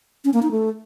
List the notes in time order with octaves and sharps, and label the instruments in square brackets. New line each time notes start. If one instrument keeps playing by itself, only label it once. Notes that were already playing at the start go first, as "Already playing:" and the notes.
[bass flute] C#4
A#3
D#4
A3